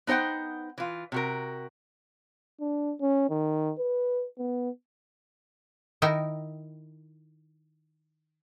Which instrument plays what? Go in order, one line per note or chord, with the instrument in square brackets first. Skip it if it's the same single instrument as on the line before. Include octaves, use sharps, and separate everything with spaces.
[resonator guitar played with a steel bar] B3 D#4 C5 F#5 G5
E3 F4
C3 F#4 A#4
[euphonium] D4
C#4
D#3
B4
B3
[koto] D#3 D#4 E4 A#4 G5